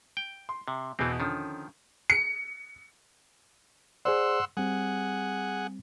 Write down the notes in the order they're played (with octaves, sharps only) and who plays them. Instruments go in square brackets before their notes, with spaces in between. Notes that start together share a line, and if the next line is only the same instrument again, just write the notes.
[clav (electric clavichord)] G5
[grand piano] C6
[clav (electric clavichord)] C3
[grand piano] E2 B2 [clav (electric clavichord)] E3 C4
[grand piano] D3 C#4 [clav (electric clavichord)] D#3 F3
[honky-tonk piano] C#7
[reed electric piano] G#4 C5 D5 [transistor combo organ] F#5 C6 E6
[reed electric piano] G3 C4 [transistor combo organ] G#4 F#5